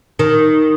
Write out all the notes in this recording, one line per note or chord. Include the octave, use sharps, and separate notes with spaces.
D#3